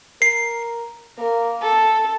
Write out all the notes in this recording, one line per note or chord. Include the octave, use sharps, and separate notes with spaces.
A#4 C7
A#3 A#4
A4